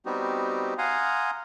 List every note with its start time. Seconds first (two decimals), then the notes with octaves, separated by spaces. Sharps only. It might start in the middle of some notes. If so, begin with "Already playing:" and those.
0.06 G3 B3 C4 D#4 F#4 G4
0.78 F5 F#5 G#5 A#5 C6 D#6